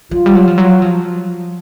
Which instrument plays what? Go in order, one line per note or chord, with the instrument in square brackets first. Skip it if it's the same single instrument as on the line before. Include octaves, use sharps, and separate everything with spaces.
[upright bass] F#3 [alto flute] F4
[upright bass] G3
F#3
F3
F#3
F3